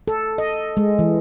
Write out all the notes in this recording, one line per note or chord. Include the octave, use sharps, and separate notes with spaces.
A4
D#5
G#3
E3